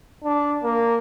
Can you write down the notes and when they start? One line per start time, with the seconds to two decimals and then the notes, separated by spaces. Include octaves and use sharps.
0.24 D4
0.63 A#3